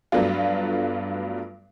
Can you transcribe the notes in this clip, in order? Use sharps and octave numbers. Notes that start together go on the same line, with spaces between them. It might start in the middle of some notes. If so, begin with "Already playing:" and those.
G2 F#3 A3 B3 D4 F4